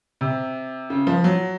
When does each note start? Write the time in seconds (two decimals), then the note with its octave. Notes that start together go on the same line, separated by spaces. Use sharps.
0.21 C3
0.90 C#3
1.07 F3
1.24 F#3